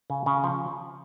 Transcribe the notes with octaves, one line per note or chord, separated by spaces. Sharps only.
C#3
C#3
F3